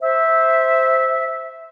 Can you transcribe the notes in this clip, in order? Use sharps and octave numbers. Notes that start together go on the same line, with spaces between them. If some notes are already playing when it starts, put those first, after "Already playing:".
C5 E5